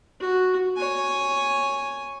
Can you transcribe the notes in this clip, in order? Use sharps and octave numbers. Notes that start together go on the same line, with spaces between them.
F#4
C#5 G#5